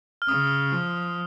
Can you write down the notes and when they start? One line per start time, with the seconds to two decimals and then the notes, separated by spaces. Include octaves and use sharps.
0.22 F6
0.28 C#3 D#6
0.72 F3